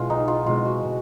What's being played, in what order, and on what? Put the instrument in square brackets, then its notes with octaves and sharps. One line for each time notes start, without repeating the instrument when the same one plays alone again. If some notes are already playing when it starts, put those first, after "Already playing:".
Already playing: [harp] B2 G#3 E4 [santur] F4
[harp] B1 [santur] D#4
[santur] F4
[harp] B2 G#3 C4 E4 [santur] F4
[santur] F#4
[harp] B2